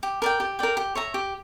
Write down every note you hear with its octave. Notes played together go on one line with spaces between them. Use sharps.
G4
A#4 D5 G5
G4
A#4 D5 G5
G4
C#5 E5 A#5
G4